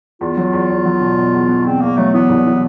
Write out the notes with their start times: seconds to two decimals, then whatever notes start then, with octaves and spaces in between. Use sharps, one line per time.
0.21 E2 F4
0.37 F#3
0.53 E2
0.70 E2
0.86 F#3
1.01 B2
1.18 B2
1.34 E2
1.49 B2
1.65 E2 C4
1.81 E2 A#3
1.97 F#3 A3
2.13 E3 B3
2.30 C2
2.46 E3